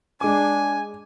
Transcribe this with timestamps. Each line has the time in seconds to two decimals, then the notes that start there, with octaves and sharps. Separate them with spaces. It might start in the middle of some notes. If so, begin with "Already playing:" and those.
0.21 G#3 D4 G#5 D6